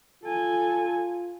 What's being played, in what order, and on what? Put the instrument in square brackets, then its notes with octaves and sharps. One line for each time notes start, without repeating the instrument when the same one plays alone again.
[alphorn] F4 [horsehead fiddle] A4 G#5